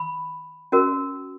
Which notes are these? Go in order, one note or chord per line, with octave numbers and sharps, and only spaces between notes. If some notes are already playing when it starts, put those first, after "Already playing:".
Already playing: B5
C#4 F#4 A#4